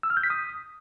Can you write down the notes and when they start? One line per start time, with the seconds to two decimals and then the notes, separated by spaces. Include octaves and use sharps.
0.03 E6
0.10 F6
0.17 G6
0.23 B6
0.30 D#6